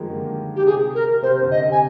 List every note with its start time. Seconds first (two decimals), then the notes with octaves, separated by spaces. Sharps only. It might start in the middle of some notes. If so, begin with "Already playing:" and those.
Already playing: D#3 F3 G3 G#3 A#3
0.10 D3
0.56 G4
0.66 C3 G#4
0.95 A#4
1.22 C3 C5
1.42 D3
1.51 D#5
1.61 C3
1.72 G#5